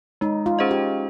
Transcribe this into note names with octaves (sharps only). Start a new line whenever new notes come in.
G#3 D#4
F4
C#4 G#4 C5 D#5
G4